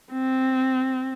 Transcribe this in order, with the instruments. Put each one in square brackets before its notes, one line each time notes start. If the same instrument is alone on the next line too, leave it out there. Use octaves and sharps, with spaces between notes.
[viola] C4